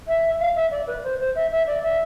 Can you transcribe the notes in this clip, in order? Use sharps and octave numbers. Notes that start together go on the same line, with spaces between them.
E5
F5
E5
D5
B4
C5
C5
E5
E5
D5
E5